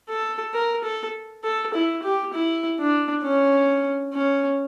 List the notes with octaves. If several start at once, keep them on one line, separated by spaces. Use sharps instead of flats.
A4
A#4
A4
A4
E4
G4
E4
D4
C#4
C#4